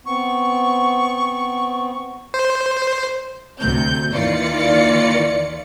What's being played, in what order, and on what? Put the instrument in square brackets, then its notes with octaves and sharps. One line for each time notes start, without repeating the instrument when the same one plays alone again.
[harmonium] B3 C4 [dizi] C#6
[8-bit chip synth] C5
[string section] D2 C3 A3 C4 G6
D#2 D#3 E3 F4 D5 C#7